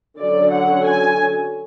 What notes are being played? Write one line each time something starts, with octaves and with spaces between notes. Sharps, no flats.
D3 F#3 C#4 D5
F#5
G#5